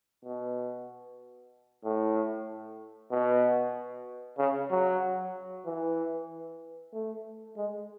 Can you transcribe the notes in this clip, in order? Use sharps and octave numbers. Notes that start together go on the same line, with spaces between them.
B2
A2
B2
C#3
F#3
E3
A3
G#3